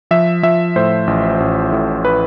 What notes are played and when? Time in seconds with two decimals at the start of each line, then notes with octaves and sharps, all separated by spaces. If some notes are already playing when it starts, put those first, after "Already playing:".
0.11 F3 E5
0.43 F3 E5
0.76 A2 C5
1.07 A1
1.40 A1
1.72 A2
2.05 B4